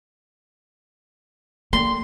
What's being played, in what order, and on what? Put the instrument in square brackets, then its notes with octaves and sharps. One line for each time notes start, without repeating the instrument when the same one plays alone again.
[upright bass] A#3 [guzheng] C6